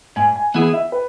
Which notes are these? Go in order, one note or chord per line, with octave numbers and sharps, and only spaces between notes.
G#2 G#5
G#5
E3 B3 E4 G#4 F#5
E5
B4